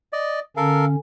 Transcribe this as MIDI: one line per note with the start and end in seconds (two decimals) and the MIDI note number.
0.13 0.40 74
0.13 0.40 75
0.57 0.96 50
0.57 0.96 61
0.57 0.85 69
0.57 0.85 70
0.57 0.85 77